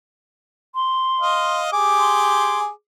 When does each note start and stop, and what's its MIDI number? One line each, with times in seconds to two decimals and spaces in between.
0.75 1.61 84
1.20 1.69 75
1.20 1.69 77
1.73 2.69 67
1.73 2.69 68
1.73 2.69 86
1.99 2.59 84